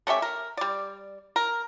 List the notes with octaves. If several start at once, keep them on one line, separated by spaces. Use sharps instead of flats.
A3 C#4 G4 E5
A#4
G3 D5
A#4